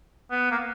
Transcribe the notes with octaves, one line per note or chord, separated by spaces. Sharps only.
B3
A#3